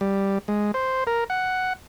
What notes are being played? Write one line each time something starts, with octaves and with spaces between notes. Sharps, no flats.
G3
G#3
C5
A#4
F#5